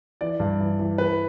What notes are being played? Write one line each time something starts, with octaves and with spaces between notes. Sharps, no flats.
E3 D5
G2
E3
E3
E3 B4